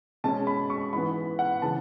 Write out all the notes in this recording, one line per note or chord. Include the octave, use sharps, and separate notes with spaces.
B2 G#3 C#4 A5
B5
C#6
G#2 E3 B3 B5
F#5
C#3 E3 B3 A5